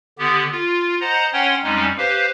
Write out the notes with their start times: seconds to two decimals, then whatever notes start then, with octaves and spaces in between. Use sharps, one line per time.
0.19 D3 B3 G4
0.52 F4
1.01 C5 D#5 F#5 A#5
1.33 C#4 C#5 F#5 G5 C6
1.64 F2 G3 G#3 C#4 D#4
1.98 G4 B4 C5 F5